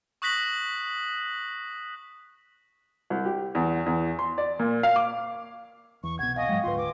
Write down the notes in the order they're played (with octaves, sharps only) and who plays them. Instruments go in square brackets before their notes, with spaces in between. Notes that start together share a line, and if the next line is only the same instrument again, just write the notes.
[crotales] C#6 D#6 F#6 A#6 B6 F#7
[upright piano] C2
G4
E2
E2
C6
D5
A#2
F5
D6
[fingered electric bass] E2 [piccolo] C#6
[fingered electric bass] C2 B2 [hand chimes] F#5 [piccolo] G#6
[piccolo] D#5 [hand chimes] F5 G#5 C#6
[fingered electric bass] G#2 F#3 G#3 [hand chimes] G5
[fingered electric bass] D#1 D2 G#2 [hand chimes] F4 B4 [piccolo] C6
[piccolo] D6